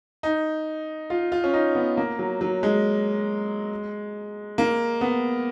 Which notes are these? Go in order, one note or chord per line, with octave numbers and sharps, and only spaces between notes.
D#4
F4
F4
C#4
D#4
B3
A#3
F#3
F#3
G#3
A#3
B3